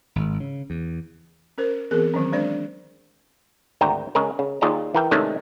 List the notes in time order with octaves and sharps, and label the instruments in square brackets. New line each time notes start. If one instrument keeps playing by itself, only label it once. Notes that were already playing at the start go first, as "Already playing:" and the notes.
[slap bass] G#1
C#3
E2
[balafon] C#4 A#4 C5
E3 B3 C4 G#4 A#4
D#3 F#3 C4 C#4
G#3 D4 C5 D5
[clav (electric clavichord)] G#1 D2 G5 A#5
C#3 G#3 G#4 A#4
C#3
D#2 F4 G#4 D5 A#5
E3 A#4 G5
C3 D#3 G#3 A3 C#4 D4